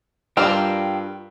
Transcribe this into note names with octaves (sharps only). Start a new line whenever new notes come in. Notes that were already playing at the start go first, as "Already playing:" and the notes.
G2 F4 A#4 D5 G5 E6